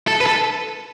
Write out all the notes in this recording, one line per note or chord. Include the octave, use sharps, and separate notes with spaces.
A4
B4
A4